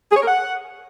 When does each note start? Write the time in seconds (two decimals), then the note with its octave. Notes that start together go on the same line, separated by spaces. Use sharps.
0.11 G#4
0.17 C#5
0.22 A#4
0.28 F#5